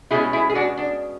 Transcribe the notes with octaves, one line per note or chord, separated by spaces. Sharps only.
B2 G#3 C#4 E4 G#4
E4 G#4
G#4
D4 F#4
D4